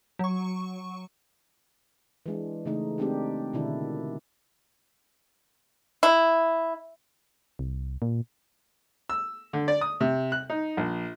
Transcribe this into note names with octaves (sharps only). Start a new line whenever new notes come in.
F#3 C#6
E3 G#3 D4
C#3 E3 A3 D#4
G#3 C4 D4 D#4 G4
B2 D3 D#3 D4 E4
E4
C2
A#2
E6
D3
D5
D#6
C3
F#6
D#4
A#1